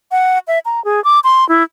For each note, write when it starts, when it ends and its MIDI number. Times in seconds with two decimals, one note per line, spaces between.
0.12 0.39 78
0.48 0.59 76
0.65 0.83 82
0.85 1.03 68
1.04 1.20 86
1.24 1.47 84
1.49 1.63 64